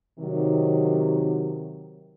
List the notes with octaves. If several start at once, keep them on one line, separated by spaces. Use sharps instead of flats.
C3 D#3 F#3